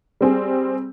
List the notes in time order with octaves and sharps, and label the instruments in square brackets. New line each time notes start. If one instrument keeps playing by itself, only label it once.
[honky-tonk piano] G3 C4 G#4